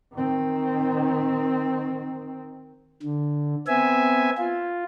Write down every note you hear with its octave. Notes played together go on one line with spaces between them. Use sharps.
D#3 C4
D3
B3 C4 E5 G#5
F4